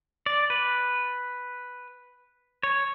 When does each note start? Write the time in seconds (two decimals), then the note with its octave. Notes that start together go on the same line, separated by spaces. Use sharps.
0.26 D5
0.50 B4
2.63 C#5